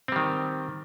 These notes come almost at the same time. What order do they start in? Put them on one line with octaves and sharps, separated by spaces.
C4 G3 D#3